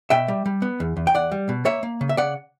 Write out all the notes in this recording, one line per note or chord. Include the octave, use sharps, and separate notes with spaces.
B2 E5 G5
G3
G3
B3
E2
E2
G5
E2 D5 F#5
G3
B2
A#3 C#5 E5
A#3
C#3
E5
C#3 D5 F#5